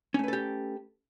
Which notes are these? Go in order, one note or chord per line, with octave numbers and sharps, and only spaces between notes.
A3 C#4 G4 A4 B4